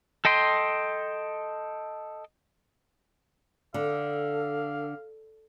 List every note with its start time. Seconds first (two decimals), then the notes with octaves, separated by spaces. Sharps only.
0.25 A4 D#5 G5 C6
3.74 D3 A4 F5